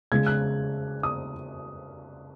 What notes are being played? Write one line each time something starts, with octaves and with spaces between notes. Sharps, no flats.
C#3 G#3 G#6
F#6
D#6